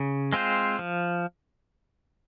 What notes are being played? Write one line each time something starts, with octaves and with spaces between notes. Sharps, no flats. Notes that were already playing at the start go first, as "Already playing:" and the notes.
Already playing: C#3
G#3 C4 F4 C5
F3